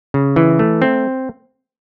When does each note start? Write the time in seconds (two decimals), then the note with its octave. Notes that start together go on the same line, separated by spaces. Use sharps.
0.14 C#3
0.36 E3
0.59 A3
0.82 C4